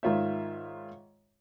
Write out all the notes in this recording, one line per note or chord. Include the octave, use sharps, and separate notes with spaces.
G#2 D#3 F4 C#5 E5